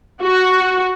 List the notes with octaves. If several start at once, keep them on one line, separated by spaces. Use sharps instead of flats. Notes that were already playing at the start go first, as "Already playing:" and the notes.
F#4